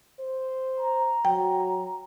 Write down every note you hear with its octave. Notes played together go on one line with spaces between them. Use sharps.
C5
A#5
F#3 G5